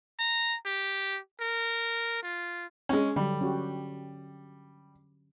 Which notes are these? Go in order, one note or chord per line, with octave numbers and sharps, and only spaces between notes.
A#5
G4
A#4
F4
G#3 C#4
D3 F#3 G3
C#4 F#4 G4